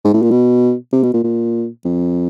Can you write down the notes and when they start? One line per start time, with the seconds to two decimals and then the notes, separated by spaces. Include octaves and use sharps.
0.05 G#2
0.14 A2
0.22 A#2
0.31 B2
0.93 C3
1.03 B2
1.14 A#2
1.24 A#2
1.85 F2